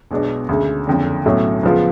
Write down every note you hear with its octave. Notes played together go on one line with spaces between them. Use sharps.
B1 B2 G#3 D4
D2 C#3 G#3
F#1 F2 D3
B1 A2 F#3 A3 C#4
C#2 C#3 F3 B3 F4